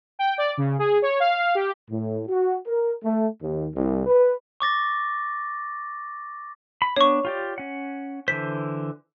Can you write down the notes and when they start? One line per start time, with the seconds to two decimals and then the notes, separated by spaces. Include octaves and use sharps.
0.19 G5
0.38 D5
0.57 C#3
0.79 G#4
1.02 C#5
1.20 F5
1.55 G4
1.89 A2
2.28 F#4
2.67 A#4
3.02 A3
3.41 D#2
3.75 C2
4.06 B4
4.60 C#6 D6 A6 A#6
6.82 B5
6.96 B3 D4 C#5 C#6
7.25 F4 G4 D5
7.58 C#4 F#5
8.28 D3 E3 C5 B6